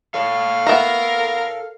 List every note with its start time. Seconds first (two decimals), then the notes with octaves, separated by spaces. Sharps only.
0.14 A4 C#5 F5
0.67 B3 A#4 E5 A#5